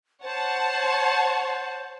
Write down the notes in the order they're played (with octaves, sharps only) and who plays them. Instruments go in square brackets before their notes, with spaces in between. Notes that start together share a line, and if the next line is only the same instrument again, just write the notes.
[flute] C5 [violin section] C#5 F#5 A5